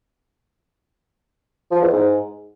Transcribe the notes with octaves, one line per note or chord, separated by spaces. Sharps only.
F3
E2
G#2